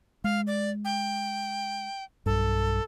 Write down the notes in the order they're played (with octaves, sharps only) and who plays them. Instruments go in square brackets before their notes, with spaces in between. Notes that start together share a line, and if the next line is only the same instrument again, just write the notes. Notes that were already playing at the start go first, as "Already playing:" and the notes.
[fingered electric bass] G#3 [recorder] F5
[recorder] D5
G5
[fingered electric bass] B1 G2 [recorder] A4